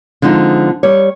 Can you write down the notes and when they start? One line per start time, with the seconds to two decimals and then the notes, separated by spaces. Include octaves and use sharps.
0.22 D3 F3 G#3 C4 D#4
0.83 G3 C#5